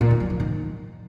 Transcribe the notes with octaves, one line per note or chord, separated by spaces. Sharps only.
A#2
D#3
F#3
F3
D#3